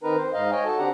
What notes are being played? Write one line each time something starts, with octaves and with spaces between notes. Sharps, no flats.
D#3 C4 D#4 A#4 B4 A#5
C5
G#2 D#4 D#5 F5
C#5 D#5 G5 G#5
F#4 A4 A5
D3 C4 D4 G4 F#5 A#5